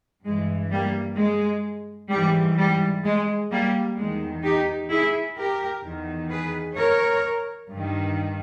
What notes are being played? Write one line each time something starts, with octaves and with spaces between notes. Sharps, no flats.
G2 E3 G#3
G3 A#3
G#3
G#2 E3 G3
G3
G#3
G3 A#3
E2 D#3 G#3
D#4 G4
E4 G#4
G4 A#4
E2 D#3
G#4 B4
A#4 C#5
G2 D#3